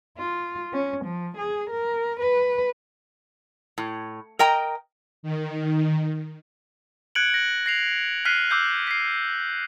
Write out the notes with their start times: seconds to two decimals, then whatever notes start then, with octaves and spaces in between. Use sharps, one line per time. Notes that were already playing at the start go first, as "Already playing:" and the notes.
0.18 F4
0.73 C#4
1.06 F3
1.38 G#4
1.71 A#4
2.20 B4
3.78 A2
4.39 A#4 D#5 G5 A#5
5.23 D#3
7.15 F#6 G#6 C#7 D7 F#7
7.34 A#6
7.66 A#6 C7 F7
8.25 F6 F#6 B6 C7 D#7
8.50 D6 E6 G6 C7
8.87 B6 C7